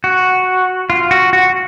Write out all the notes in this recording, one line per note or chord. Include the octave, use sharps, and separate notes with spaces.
F#4
F4
F#4
F#4